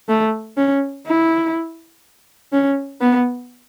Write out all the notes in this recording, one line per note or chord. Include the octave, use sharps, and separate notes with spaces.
A3
C#4
E4
C#4
B3